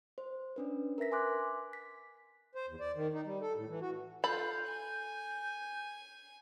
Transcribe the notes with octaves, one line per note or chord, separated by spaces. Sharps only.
C5
C#4 D4 B4
A#4 B4 E5 A#6 B6
G#5 C6 D6 F#6
B6
C5
E2
D5
D#3
D#4
G3
A4
A2
E3
F#4
F4 A4 B5 G6
G#5